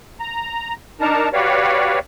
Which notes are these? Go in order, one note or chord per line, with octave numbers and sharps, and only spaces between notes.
A#5
D4 D#4 A#4 A5 A#5
F#4 G4 B4 C#5 D5 F5